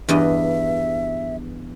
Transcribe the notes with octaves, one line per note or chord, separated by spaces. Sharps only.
E2 G2 D#5 E5